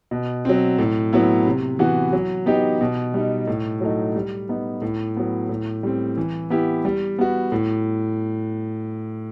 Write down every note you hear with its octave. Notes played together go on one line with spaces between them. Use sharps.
B2
F#3 C4
A2
F#3 B3 E4
C3
E3 B3 F#4
F#3
B3 D#4 G4
B2
G3 D#4
A2
F#3 A3 D#4
G3
B3 D#4
A2
F#3 B3
A2
G3 C4
E3
B3 E4 G4
G3
B3 F#4
A2